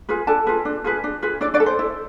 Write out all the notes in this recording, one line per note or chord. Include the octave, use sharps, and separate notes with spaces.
F4 G#4 B4
D4 A4 A5
F4 G#4 B4
D4
F4 G#4 B4
D4
F4 G#4 B4
D4 E4 D5
D4 D5
A4
C5
E4